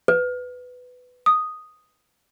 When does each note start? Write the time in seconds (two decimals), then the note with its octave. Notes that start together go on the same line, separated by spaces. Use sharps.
0.08 B4
1.26 D#6